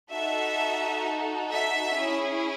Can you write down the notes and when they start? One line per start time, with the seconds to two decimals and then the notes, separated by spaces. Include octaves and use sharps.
0.11 D#4 F#4 A4 E5
1.49 E5
1.96 C#4 E4 G#4